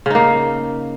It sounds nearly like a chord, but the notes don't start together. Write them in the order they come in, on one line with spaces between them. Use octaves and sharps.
C#3 D#4 A#3